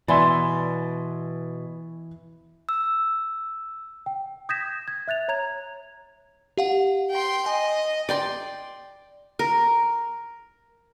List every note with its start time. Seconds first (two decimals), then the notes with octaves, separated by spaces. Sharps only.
0.08 B2 E3 D5 E5 G#5 B5 C6
2.69 E6
4.06 G5
4.49 D#6 G6 G#6 A#6 B6 E7
4.88 G#6
5.08 E5 F#6 A6 F7
5.28 C#5 A#5 G#6 F7
6.58 G4 F5 F#5
7.10 G5 C6
7.46 D#5 G#5
8.09 D5 G5 C6
9.39 A#4